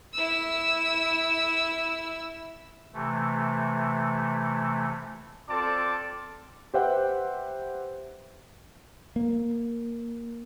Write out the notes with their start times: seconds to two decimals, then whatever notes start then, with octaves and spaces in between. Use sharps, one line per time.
0.14 E4 E6
2.94 C3 E3 A3
5.49 C4 F4 A4 D5 A5 D6
6.74 G4 B4 C5 E5 F#5 G5
9.16 A#3